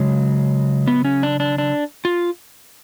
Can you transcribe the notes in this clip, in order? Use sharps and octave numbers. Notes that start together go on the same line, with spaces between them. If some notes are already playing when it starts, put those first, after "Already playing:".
Already playing: C#3 F#3 G#3
B3
C#4
D4
D4
D4
F4